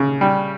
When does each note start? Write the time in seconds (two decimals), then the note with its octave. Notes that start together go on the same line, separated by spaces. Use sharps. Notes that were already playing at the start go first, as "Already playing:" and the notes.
Already playing: C#3
0.21 G3